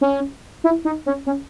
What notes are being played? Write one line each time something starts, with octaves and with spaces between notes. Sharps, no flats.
C#4
E4
D#4
C#4
C#4